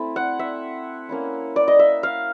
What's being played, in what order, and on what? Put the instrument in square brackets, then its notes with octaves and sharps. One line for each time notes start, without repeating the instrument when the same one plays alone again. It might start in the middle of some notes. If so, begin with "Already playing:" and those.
Already playing: [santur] A3 C4 E4
F#5
E5
A#3 C#4 E4
D5
D#5
E5
F5